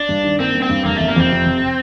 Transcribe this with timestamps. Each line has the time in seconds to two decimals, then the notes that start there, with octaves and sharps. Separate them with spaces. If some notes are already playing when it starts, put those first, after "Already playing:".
Already playing: D4
0.09 G2
0.24 D#3
0.40 A#3 C4
0.55 G2
0.63 C4
0.69 G2
0.85 F1 A#3
0.97 F1 A3
1.08 A#3
1.16 F2 C4
1.31 C3
1.46 F1